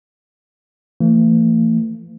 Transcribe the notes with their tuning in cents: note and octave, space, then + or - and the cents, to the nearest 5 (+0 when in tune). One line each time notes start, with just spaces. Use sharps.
E3 +35 A3 +45